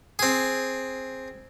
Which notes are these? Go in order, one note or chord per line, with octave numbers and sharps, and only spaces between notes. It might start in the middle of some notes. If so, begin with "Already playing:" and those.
C4 G#4